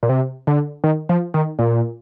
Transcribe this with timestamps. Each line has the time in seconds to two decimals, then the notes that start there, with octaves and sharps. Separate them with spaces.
0.03 A#2
0.09 C3
0.47 D3
0.84 D#3
1.09 F3
1.34 D#3
1.59 A#2